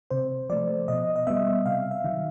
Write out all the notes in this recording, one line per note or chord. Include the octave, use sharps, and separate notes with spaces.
C3 C5
F3 A3 D5
B2 D#5
D#5
G3 B3 E5
C3 F5
E5
D#3 F#3